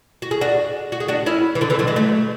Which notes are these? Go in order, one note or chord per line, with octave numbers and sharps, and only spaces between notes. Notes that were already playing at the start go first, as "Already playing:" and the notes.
F#4
G#4
D4 F#4
F#4
G#4
D4 F#4
C#4 E4
E3
D3 F#3
C#3 E3
D3 F#3
E3 G#3
F#3 A3